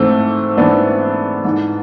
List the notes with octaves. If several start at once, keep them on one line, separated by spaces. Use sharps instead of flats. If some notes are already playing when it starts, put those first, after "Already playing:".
Already playing: G#2 E3 A3 C4
G#2 E3 B3 D4
G#2 E3